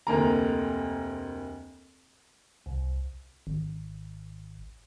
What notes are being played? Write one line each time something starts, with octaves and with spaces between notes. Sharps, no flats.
F1 D2 A#3 A#5
C2
G#1